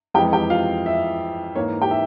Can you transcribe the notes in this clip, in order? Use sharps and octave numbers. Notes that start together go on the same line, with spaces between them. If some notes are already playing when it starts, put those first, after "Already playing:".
F2 E3 G#3 G4 G5
G4 G5
F4 F5
E5
G#2 E3 A#3 C#5
G4 G5
E5